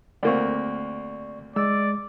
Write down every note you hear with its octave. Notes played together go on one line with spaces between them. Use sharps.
D2 A#3 C4 D5 C#6
G#3 D5 E6